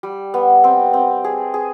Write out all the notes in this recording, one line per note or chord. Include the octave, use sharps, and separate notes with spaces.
G3
B3
C4
C4
G#4
G#4